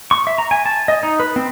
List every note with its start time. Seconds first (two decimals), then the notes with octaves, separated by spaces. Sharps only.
0.11 C#6
0.27 E5
0.38 A#5
0.51 G#5
0.66 A5
0.88 D#5
1.03 D#4
1.20 B4
1.36 C4